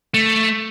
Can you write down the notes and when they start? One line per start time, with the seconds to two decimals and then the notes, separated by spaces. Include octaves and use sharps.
0.14 A3